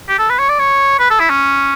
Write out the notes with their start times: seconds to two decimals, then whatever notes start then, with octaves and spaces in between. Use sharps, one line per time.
0.09 G4
0.19 A4
0.30 B4
0.39 C#5
0.49 D5
0.59 C#5
0.99 B4
1.10 A4
1.20 E4
1.30 C#4